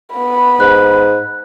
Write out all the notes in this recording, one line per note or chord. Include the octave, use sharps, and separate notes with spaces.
B3 B5
G#2 F#6